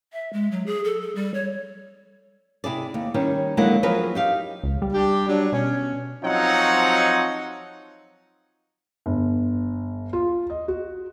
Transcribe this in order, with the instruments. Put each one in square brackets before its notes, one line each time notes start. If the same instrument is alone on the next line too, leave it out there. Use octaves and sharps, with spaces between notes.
[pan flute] E5
G#3
F#3
G#4
A4
A4
G3
C#5
[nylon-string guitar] C3 E4 G#4 D5
D#2
D#3 G3 C#4
D3 F#3 G#3 A#3 E4 F#5
F3 F#3 C4 G#4 A#4 B4
D#4 G4 F5
[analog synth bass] C#2
G3
[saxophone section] D4 G4
F#3 D4
[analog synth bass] B2 [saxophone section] C#4
[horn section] F3 F#3 C4 D#4 C#5 F#5
[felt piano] G1
F4
D#5
F#4